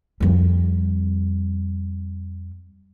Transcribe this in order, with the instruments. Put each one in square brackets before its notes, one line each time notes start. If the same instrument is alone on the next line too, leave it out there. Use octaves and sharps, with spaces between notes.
[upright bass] F2 G3